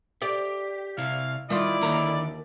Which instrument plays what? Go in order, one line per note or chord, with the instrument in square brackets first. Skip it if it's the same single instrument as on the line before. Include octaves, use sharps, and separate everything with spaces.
[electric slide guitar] G4 [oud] D5
[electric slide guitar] C3 E4 [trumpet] F5
[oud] D#3 F4 [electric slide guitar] G3 [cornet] E4 [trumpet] D5
[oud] D#2 A#4 [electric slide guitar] D3 D#3 A#5